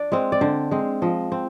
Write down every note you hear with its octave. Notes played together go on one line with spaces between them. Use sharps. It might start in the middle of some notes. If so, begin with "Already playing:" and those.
Already playing: D4 D5
G#3 C4
D5
D3 C5
G#3 C4
F3 D#5
C4